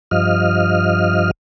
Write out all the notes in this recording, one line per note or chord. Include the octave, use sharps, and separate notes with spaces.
G2 F3 D#5 F6